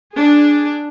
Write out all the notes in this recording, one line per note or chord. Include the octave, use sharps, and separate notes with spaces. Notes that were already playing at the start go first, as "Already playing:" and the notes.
D4 G#4